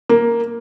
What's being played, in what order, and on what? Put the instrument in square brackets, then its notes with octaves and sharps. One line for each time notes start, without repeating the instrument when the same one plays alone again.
[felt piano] A#3